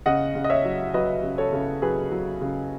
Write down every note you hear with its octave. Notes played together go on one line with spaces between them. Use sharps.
C#3 D#5 F#5
C#3
D#5
C#5 E5
F#3
F#3 B4 D#5
C#3
A4 C#5
C#3
F#3 G#4 B4
F#3
C#3